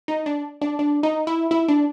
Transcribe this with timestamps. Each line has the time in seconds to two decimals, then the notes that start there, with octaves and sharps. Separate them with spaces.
0.08 D#4
0.26 D4
0.61 D4
0.79 D4
1.03 D#4
1.27 E4
1.51 E4
1.68 D4